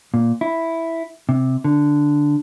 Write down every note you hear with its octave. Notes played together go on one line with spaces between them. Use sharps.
A#2
E4
C3
D3